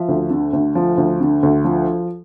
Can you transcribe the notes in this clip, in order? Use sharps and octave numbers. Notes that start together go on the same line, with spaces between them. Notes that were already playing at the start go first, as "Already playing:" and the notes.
Already playing: F3 E5
D2
D3
D2
F3
D2
D3
D2
F3